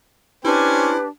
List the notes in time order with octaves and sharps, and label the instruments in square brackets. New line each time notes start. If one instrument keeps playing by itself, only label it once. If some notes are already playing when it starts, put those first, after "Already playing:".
[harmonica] C#4 C5 G#5 [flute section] D4 G4 [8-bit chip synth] E4 [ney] B4